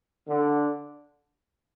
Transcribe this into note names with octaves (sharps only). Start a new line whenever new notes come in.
D3